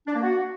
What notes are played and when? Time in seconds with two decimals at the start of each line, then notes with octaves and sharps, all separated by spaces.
0.07 D4
0.14 A#3
0.22 F#4